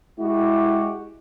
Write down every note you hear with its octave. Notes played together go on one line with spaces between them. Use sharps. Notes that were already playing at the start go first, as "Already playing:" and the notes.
G#3 E4 F#4 G4